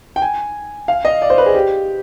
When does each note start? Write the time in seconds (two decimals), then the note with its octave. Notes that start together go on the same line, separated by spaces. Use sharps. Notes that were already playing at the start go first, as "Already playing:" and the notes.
0.16 G5
0.22 G#5
0.88 F5
1.05 D#5
1.22 D5
1.30 C5
1.38 B4
1.46 G#4
1.54 G4